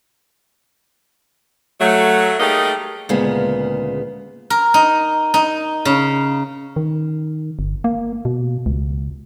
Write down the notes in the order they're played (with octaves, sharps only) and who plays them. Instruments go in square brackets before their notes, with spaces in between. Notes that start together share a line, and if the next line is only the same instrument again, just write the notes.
[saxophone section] F#3 A3
G3 A3 A#3 D#4 G4 G#4
[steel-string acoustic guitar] D2 A#2 C#3 G#3 A#3 B3
[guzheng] A#4
D#4
D#4
C#3
[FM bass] D#3
G1
A#3
B2
C#2